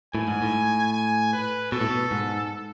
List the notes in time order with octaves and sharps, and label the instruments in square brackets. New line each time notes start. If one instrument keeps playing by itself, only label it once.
[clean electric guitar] A2 [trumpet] G#5
[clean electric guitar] G#2
A2
[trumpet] G#5
B4
[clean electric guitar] B2 [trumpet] A4
[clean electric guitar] A2
B2
G#2